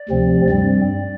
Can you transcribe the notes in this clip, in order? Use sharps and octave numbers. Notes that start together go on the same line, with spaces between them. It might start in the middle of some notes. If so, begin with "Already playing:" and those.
Already playing: D5
D2 C3 F3 C4
G2 G3 C4 D5